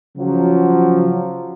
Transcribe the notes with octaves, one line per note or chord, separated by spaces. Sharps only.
C#3 F3 F#3